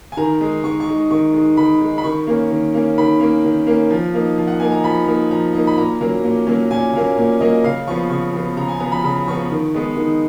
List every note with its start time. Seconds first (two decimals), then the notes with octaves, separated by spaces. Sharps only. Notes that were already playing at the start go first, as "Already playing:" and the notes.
0.12 G#5
0.17 D#3 A#5
0.41 G#3 D#4
0.64 D#3 C#6
0.80 C#6
0.87 G#3 D#4
1.11 D#3 C#6
1.34 G#3 D#4
1.57 D#3 B5
1.81 G#3 D#4
1.98 B5
2.04 D#3 C#6
2.27 A#3 C#4
2.51 D#3
2.74 A#3 C#4
2.98 D#3 B5
3.20 A#3 C#4
3.44 D#3
3.67 A#3 C#4
3.91 F3
4.14 A#3 D#4
4.38 F3
4.47 F#5
4.60 A#3 D#4 G#5
4.72 A#5
4.84 F3 B5
5.07 A#3 D#4
5.31 F3 A#5
5.54 A#3 D#4
5.67 B5
5.77 A#2 A#5
6.01 F#3 A#3 C#4
6.24 A#2
6.47 F#3 A#3 C#4
6.71 A#2 G#5
6.93 F#3 A#3 C#4
7.18 A#2
7.40 F#3 A#3 C#4 D#5
7.64 C#3 F5
7.87 F3 C#6
7.91 B3
8.10 C#3 C#6
8.33 F3 B3
8.57 C#3 A#5
8.69 G#5
8.80 F3 B3 A#5
8.92 B5
9.04 C#3 B5
9.27 F3 B3 C#6
9.51 D#3
9.74 G#3 B3 D#4
9.97 D#3